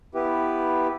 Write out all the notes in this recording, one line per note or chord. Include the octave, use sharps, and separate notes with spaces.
B3 E4 G4 B4